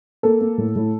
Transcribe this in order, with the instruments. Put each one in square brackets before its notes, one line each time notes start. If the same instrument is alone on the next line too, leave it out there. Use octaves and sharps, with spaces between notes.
[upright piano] A#3 A4
A#3
A2
A2